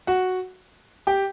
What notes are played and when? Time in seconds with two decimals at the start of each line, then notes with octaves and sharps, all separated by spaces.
0.07 F#4 F#5
1.07 G4 G5